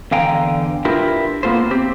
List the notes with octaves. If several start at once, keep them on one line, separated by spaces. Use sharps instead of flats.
E2 D3 F5 G5 G#5 A#5
D4 E4 F4 G4 A#4 B4
A#3 B3 F4 A4 C5
C4 G4